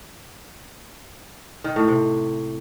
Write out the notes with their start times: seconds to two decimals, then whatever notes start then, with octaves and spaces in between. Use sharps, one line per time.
1.64 D#3
1.76 A2
1.88 C3